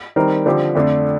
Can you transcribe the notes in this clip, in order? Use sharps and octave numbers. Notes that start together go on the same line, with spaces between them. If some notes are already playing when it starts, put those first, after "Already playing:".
D#3 G3 C4 D#4 A#4
D3 F3 C4 G4
F2 D3 A3 D4